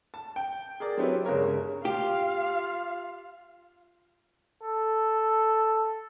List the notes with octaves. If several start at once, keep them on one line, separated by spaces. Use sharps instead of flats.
A5
G5
G#4 A#4 D5
F#3 C4 C#4 E4 G4 B4
G1 C#3 G#3 A#4 C#5
F4 G4 F5
A4